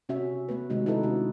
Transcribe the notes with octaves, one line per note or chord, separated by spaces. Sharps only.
C3 C#4 F#4 E5
A3 B3 B4
C3 D#3 G#3 D#4 F#4
D#4 E4 G4 A4 B4
C3 D4 F#4